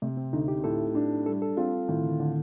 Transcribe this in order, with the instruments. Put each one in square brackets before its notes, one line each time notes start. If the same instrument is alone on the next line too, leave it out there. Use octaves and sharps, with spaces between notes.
[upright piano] C3 [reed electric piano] A3
[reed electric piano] C4
[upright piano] D2 [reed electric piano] D#4
[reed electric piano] G4
[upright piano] A2 [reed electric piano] A4
[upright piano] D4
[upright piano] G3 [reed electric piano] A4
[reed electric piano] A4
[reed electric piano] C4 [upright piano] F4
[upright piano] A2 [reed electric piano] D#3
[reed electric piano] D3
D3